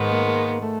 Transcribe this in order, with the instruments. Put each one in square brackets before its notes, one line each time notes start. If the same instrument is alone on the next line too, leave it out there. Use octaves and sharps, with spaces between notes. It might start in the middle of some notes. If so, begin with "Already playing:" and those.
Already playing: [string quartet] G#2 D#3 G#3 B3
[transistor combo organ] A#3
A#3
A3